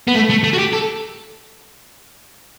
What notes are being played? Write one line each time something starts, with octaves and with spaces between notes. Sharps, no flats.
B3
A3
A3
A3
F#4
G4
A4